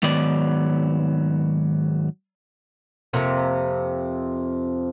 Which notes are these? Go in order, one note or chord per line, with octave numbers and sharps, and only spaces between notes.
G#2 D#3 F#3 B3 D5
F2 C3 A#3